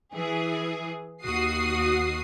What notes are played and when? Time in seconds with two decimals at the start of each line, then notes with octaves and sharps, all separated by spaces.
0.12 E3 G#4
1.24 D#2 F#4 D#6 C7